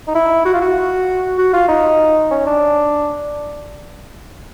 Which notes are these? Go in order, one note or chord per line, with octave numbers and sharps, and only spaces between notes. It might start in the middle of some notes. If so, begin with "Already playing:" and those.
D#4
E4
F#4
F4
F#4
F#4
F4
D#4
C#4
D4